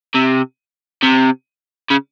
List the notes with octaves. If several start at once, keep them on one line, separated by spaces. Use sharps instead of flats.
C3
C3
C#3